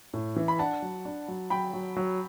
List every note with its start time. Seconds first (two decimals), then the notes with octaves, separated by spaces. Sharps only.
0.14 A2
0.36 E3
0.48 B5
0.59 D4 F#5 A5
0.82 F#3
1.05 D4
1.28 F#3
1.50 F#3 G5 B5
1.73 F#3
1.96 F#3